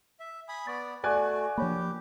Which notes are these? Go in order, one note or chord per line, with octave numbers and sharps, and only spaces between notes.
E5
G#5 B5 D#6
B3 D5 C#6 A6
A3 F#4 D5 G#5 F#6
F3 A#3 D4 G4 C#5 B5